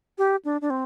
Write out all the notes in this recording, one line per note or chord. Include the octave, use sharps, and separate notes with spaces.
G4
D4
D4
C4